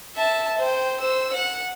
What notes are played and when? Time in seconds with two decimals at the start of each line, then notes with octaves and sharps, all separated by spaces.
0.16 E5 A5
0.57 C5 G5
1.00 C5 E6
1.33 F#5